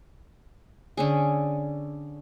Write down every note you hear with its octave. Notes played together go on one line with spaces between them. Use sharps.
D3 C#4 G#4